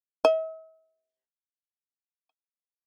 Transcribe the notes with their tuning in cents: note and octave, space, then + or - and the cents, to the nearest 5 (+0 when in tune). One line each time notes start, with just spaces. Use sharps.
E5 -45